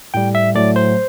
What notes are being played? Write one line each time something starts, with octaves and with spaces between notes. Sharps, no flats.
A2 G3 G5
E5
A2 F#3 A3 D5
C5